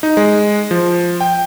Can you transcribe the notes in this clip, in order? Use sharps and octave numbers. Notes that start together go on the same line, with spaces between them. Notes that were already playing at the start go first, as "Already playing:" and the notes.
D#4
G#3
F3
G5